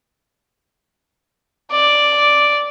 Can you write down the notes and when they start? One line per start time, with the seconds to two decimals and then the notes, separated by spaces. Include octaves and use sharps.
1.71 D5